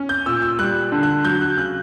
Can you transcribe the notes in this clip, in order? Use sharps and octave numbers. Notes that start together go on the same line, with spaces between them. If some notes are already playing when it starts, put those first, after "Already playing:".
Already playing: C#4
G6
A#2 E6
E6
G3 F#6
D3
F#6
F#3 G6
F#6
C#3 F#6